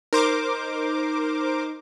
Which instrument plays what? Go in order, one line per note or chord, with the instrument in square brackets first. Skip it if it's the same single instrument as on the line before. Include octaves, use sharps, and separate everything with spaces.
[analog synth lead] D#4 [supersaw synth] A#4 C5 D6